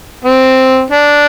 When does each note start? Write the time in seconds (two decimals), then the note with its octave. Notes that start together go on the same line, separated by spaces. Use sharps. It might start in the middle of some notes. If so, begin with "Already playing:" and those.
0.25 C4
0.90 D4